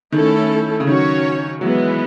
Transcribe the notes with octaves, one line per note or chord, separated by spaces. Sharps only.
D#3 A3 C#4 E4 A4
C#3
D#3 F#3 C#4 F#4 C#5
E3 F#3 G#3 B3